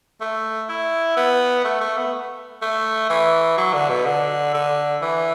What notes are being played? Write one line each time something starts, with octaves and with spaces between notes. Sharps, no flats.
A3
E4
B3
A3
A3
B3
A3
E3
F#3
D3
B2
D3
D3
E3